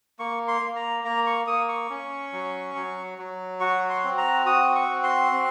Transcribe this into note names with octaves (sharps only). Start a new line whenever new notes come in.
A#3 C#6
C6
A#3
A#5
A#3 A#5
C#6
A#3 D#6
C#6
C#4
F#3
F#3
F#3
F#4 C#6
C6
C4
A#5
F#4 D#6
C#6
C4
C6
C4